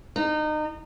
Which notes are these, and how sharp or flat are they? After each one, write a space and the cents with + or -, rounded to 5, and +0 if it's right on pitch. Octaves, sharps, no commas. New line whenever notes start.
D#4 -30